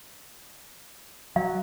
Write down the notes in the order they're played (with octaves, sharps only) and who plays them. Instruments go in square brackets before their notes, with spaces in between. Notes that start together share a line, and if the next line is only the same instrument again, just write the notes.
[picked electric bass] F#3 [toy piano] F5